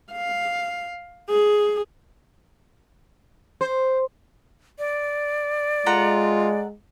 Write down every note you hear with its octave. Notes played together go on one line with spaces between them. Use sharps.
F5
G#4
C5
D5
G#3 F4 A4 F#5 A#5